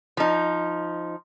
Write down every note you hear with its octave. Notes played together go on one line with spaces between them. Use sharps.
F3 D#4